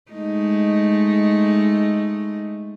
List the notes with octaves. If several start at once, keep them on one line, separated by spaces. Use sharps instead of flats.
G#3 A3 D#4